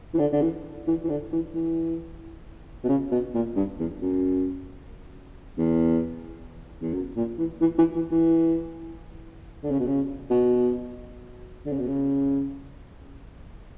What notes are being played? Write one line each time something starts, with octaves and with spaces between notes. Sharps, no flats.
E3
D3
D3
E3
E3
E3
D3
E3
E3
B2
C#3
B2
A#2
G2
E2
F#2
E2
E2
F#2
A#2
E3
E3
E3
E3
E3
D3
C#3
B2
C#3
B2
D3
C#3
B2
C#3